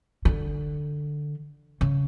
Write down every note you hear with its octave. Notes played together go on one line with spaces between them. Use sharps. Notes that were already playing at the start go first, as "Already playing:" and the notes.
D3
C#3